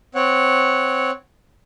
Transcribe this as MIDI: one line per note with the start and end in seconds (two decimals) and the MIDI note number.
0.15 1.11 60
0.15 1.11 73
0.15 1.11 78